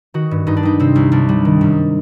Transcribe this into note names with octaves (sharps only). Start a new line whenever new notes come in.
D#3 F#4
G2
G2 D#4
D4
G3 D#4
C3 C4
C2
C2 D4
G3
D#3
F#2